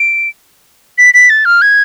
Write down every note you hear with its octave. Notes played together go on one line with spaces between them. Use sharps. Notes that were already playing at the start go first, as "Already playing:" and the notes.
Already playing: D7
B6
B6
A6
F6
G#6